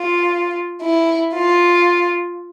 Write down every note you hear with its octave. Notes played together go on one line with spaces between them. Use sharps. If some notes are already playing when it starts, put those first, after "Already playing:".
Already playing: F4
E4
F4